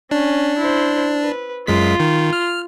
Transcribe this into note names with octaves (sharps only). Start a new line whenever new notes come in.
C#4 D4
E4 C5
B4
F#2 G#3 F4 B6
D#3
F6